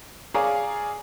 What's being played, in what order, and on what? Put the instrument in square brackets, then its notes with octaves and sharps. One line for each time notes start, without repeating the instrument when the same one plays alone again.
[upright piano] G#4 C#5 D5 F5 A#5